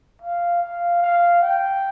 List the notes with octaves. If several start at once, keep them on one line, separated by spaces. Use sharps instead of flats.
F5
F5
F5
G5